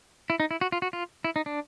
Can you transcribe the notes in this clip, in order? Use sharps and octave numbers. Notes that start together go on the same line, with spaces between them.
E4
D#4
E4
F#4
F4
F#4
F4
E4
D#4
D4